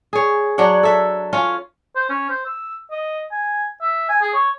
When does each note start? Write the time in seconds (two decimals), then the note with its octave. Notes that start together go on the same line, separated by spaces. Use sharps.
0.13 G#4 C#5
0.58 F#3 D4 C#5 F#5
0.83 A4 E5
1.33 C#4 F4 C#5
1.96 C5
2.09 C#4
2.30 C5
2.45 E6
2.91 D#5
3.32 G#5
3.82 E5
4.09 G#5
4.22 G#4
4.34 C#5